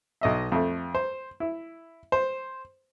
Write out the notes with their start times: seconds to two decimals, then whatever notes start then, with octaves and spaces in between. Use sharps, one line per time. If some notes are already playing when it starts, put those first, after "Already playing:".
0.21 B1 D#5 E5
0.52 F2 A3
0.95 C5
1.40 E4
2.12 C5